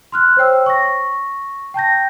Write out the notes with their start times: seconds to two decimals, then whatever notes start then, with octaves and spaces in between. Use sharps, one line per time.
0.12 C6 F6 F#6
0.37 C5 C#5 G5 E6
0.66 C#6 A#6
1.74 G5 A5 G6 A#6